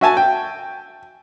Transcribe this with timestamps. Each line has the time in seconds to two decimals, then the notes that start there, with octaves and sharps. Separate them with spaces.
0.01 F#4 E5 G#5 A5
0.17 G5